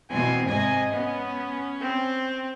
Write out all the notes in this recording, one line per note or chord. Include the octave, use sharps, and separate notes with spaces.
B2 E3 C4 G#5
G#2 C3 D#5 G#5
B3 C#4
C4